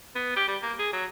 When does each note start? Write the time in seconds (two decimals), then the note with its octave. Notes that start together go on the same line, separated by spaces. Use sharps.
0.15 B3
0.36 G4
0.48 G3
0.62 A#3
0.79 G#4
0.93 F#3